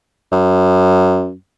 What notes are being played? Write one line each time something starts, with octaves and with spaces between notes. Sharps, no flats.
F#2